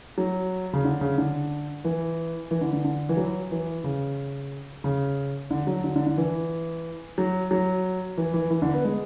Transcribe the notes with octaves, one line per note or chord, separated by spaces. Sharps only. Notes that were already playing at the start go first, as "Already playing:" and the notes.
F#3
C#3
D3
C#3
D3
E3
E3
D3
D3
D3
E3
F#3
E3
C#3
C#3
D3
F#3
D3
D3
D3
E3
F#3
F#3
E3
E3
E3
D3
B3
G#3